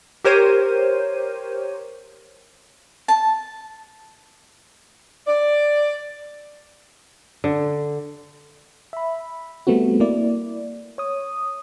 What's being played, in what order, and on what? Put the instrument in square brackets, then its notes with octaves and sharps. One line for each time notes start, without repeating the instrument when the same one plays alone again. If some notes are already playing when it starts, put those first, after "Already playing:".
[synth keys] G4 A#4 C5 C#5 D#7
[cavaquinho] A5
[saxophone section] D5
[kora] D3
[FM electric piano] E5 B5
G3 A3 B3 C4 F#4
A#3 E4 D5
C#5 D#6